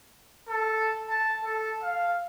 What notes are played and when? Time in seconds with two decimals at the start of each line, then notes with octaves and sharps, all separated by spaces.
0.49 A4
1.09 A5
1.44 A4
1.83 F5